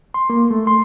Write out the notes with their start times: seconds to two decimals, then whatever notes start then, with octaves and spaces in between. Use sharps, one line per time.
0.14 C6
0.30 A#3
0.51 A3
0.67 C6